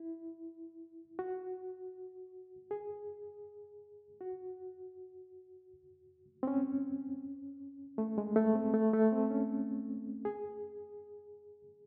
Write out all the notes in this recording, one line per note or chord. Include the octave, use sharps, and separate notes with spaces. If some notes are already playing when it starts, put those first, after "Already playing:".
Already playing: E4
F#4
G#4
F#4
C4
C#4
A3
G#3
A3
C4
A3
A3
C4
C#4
G#4